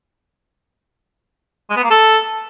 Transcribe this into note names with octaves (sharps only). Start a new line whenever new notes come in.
G#3
B3
A#3
A4